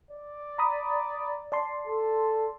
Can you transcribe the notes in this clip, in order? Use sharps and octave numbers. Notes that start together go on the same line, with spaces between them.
D5
A#5 B5 D#6
D5 A5 C6
A4